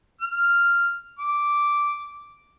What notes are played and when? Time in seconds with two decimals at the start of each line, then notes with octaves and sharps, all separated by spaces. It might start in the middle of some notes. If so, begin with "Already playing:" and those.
0.20 F6
1.18 D6